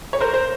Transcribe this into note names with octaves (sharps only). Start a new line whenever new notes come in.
C#5
A#4 C5
C5